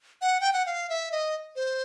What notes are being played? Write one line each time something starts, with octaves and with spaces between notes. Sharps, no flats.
F#5
G5
F#5
F5
E5
D#5
C5